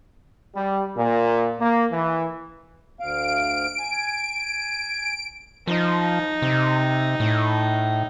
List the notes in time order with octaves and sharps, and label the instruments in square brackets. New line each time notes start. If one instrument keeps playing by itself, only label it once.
[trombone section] G3
A#2
A#3
E3
[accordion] D2 F5 [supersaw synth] D7
[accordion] G#5
[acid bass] F3 [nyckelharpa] D#4
[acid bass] C3
A2